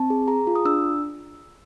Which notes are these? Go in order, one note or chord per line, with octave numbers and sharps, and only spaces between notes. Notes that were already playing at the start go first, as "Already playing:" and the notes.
Already playing: C4 A5
G#4
G#4 A#5
F4
D#6
D4 E6